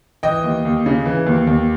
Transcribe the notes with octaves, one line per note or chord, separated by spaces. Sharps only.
E3 D#5 G5
D#2
D#2
C#3
E3
D#2
D#2